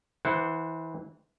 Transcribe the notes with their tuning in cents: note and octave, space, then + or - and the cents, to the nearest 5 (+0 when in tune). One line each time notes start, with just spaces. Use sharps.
E3 -20 C5 +0 F#5 +5